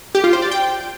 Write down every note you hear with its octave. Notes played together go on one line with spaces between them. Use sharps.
G4
F4
C5
D5
G5